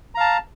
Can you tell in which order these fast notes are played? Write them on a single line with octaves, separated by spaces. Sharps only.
A#5 F5 A5